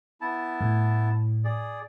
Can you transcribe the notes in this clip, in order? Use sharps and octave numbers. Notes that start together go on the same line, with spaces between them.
B3 E4 A5
A2
G#4 D5